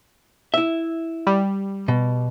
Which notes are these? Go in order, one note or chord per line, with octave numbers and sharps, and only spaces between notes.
E4 E5
G3
B2